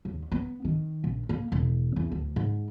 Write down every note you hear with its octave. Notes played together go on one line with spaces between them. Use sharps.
D#2
B3
D#3
A#1
A#3
E1
E2
D2
G#2